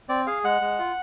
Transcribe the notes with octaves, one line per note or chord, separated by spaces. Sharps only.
C4 D5
G#4 F5
G#3 F#5
G#3
F4